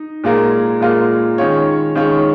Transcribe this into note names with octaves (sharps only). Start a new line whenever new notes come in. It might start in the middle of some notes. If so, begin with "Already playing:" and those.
Already playing: D#4
A#2 G#3 F4 A#4
A#2 G#3 F4 A#4
D#3 G#3 C#4 F4 C#5
D#3 G#3 C#4 F4 C#5